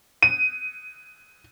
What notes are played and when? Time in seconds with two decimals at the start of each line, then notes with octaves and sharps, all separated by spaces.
0.23 D#7